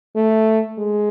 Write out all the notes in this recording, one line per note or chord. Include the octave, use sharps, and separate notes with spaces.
A3
G#3